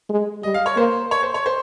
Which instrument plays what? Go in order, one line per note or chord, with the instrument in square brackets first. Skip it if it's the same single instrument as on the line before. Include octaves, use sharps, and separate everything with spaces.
[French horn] G#3
[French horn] G3 [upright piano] D#5
[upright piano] F5
C#5
[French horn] A#3 [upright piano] C5
[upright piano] C#5
C5
C#5
C5